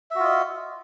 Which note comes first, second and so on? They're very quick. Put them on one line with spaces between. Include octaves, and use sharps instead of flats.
E5 F#4 F4 D#5